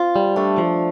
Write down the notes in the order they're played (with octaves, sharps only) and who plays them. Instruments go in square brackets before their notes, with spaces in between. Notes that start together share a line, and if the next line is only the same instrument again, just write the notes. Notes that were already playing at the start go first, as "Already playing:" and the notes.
Already playing: [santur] C4 [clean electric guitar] F4
[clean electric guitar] G3
[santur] A3 [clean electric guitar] D4
[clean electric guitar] F3